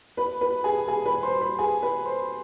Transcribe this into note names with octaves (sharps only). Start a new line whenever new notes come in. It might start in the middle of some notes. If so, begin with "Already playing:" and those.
B4 B5
B4 B5
G#4 G#5
G#4 G#5
B4 B5
C5 C6
B4 B5
G#4 G#5
B4 B5
C5 C6